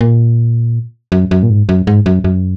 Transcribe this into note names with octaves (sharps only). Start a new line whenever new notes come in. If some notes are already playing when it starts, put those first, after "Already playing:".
A#2
F#2
F#2
A#2
G#2
F#2
G#2
F#2
F#2